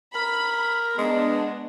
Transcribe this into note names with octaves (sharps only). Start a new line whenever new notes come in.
A#4 B5
G#3 B3 D4